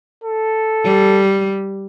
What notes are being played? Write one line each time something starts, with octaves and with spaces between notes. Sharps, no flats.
A4
G3